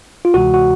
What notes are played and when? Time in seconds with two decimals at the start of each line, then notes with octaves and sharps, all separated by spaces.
0.25 F4
0.34 D2 C3 E3 G#3 F#4
0.54 F#4